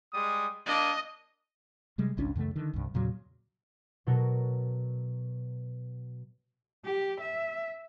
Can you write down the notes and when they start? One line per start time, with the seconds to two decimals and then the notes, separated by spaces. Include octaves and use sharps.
0.13 G3 G#3 D#6
0.66 A#3 D4 D#5
1.98 C3 G3 G#3
2.17 G#1 C#2 C#4 D4
2.36 F#2 C#3 E3 A3
2.55 D3 D#3
2.73 C2 G2
2.94 E2 A#2 C#3 F#3
4.07 B2 F#3 F#4 A4 A#4
6.85 G4
7.20 E5